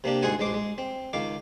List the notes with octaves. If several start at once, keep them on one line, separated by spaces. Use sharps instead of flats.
C3 A#3 D4 G4
D2 G#2 G#4 C5 F#5 G#5
A1 G#3 C5 D6
G#3
C4
C#2 D#3 F5 D6